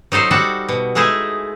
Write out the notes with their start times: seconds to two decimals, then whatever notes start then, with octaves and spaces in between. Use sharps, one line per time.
0.12 F#3 D#4 A4 C5
0.31 G3 F#4 A4 F#5
0.69 B2
0.95 G#3 A3 D#4 E4 G#4